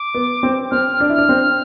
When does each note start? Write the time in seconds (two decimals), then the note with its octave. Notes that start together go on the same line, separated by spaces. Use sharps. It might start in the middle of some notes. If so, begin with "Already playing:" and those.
Already playing: D6
0.14 B3
0.43 C4
0.71 C4 F6
1.00 D4
1.09 E4
1.14 D4 F6
1.29 C4